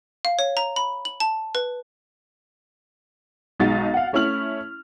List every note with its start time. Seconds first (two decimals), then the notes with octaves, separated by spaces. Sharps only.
0.25 F5
0.39 C#5
0.57 A#5
0.76 B5
1.05 F#7
1.20 A5
1.55 B4
3.60 B1 G#3 D#4 F#4 A6
3.94 F5 F#5
4.13 A3 C#4 E4 F6 F#7